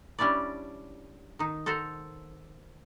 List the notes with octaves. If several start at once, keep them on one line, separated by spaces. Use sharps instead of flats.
G3 C#4 D4 E4 D5
D#3 D#4
A4 C5 F#5 A#5